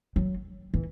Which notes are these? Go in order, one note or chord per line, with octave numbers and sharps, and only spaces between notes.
F#3
E3